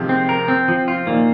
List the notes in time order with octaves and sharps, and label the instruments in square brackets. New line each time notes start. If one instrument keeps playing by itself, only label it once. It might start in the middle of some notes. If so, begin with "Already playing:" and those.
Already playing: [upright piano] C3 D#3 F3 G#3
[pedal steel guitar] C4
A#4
C4
F3
F4
[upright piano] A#2 D#3 [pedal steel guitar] A#3